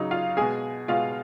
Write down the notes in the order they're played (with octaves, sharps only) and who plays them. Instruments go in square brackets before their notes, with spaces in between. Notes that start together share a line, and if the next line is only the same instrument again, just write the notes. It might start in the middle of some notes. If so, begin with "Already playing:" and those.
Already playing: [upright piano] C#3 F#3 D#4 D#5
F4 F5
B2 G#3 G#4 G#5
B2 G#3 F4 F5